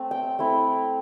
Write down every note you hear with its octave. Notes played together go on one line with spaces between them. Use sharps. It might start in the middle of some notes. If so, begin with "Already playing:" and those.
Already playing: A3 C4
G5
A3 C4 E4